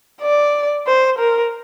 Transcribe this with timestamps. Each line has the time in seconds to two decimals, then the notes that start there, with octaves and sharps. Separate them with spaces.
0.22 D5
0.87 C5
1.19 A#4